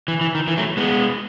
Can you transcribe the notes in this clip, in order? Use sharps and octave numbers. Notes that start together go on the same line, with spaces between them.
E3
E3
D#3
E3
F#3 A3
G#3 B3